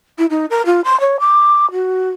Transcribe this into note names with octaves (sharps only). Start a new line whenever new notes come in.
E4
D#4
A#4
F4
C6
C#5
D6
F#4